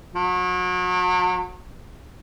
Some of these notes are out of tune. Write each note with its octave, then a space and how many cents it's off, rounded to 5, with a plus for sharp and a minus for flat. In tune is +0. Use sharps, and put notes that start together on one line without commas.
F#3 -35